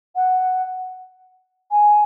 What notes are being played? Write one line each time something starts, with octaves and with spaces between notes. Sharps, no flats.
F#5
G#5